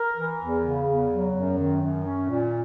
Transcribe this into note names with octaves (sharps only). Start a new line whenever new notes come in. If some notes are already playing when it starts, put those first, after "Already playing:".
Already playing: A#4
E3
E2
C#3
E2
F#3
F#2
D#3
F#2
C#4
A#2